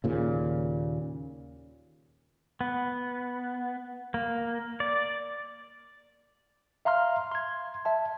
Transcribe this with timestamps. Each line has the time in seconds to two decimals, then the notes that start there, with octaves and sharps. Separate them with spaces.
0.04 D#2 A#2 C#3
2.61 B3
4.14 A#3
4.80 D5
6.85 E5 F5 A#5 C6 F6
7.31 C6 G#6
7.85 E5 A5